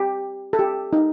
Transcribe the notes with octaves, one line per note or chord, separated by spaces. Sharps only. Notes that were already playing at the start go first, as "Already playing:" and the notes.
Already playing: G4
A4
G4
D#4